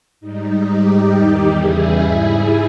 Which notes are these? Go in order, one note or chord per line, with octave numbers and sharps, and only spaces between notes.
G#2 G3 D#4
G#2 G3 D#4 G4
E2 D#3 G3 D#4 G4
E2 C#3 E3 G3 E4 G#4
G#2 G3